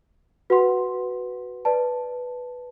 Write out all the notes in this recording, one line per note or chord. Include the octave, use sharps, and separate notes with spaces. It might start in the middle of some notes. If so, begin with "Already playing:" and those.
F#4 B4 F#5 C6
B4 D5 A5